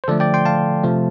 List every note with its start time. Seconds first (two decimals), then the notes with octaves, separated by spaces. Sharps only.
0.04 C5
0.08 D3 F3 A3 A4 D5
0.20 D5 G5
0.34 G5 C6
0.45 F5 A5
0.84 C3 F3 A3